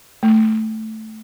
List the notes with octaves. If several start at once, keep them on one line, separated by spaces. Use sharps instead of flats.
A3